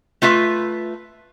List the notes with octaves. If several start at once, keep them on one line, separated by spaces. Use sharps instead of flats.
A3 F4 B4 E5